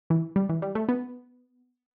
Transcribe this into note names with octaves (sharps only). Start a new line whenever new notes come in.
E3
G3
E3
G3
A3
B3